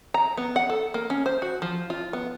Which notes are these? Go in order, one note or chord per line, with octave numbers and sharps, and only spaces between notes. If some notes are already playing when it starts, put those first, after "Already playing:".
A#5
B3
F#5
A4
A#3
C#4
C5
F#4
F3
F4
B3